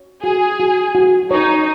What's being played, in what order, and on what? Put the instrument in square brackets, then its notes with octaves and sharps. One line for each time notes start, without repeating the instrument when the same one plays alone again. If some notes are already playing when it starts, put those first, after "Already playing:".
Already playing: [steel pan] C#5
[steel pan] F#4 [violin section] G#4
[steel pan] F#4
F#4
[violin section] D#4 [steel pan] C#5